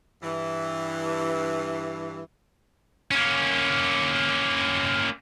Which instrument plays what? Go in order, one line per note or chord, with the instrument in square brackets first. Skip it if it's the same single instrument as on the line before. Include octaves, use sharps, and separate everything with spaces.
[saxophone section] G2 E3
[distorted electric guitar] A#3 C#4